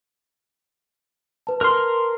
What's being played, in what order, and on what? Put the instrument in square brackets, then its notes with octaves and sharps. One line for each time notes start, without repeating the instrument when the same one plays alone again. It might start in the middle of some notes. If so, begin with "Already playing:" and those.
[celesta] B4 A5
[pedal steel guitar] A#4 C6